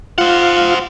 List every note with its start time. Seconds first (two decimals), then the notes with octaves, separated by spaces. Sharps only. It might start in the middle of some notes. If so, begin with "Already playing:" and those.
0.18 F4 C5 F#5